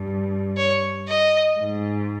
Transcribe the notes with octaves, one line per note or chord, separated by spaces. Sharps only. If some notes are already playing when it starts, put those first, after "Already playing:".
Already playing: G2
C#5
D#5
G#2